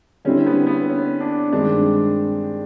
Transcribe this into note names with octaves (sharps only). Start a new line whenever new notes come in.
D3 G3 C4 C#4 E4
B3
B3
C#4
D4
G2 D#3 G#3 C4 D4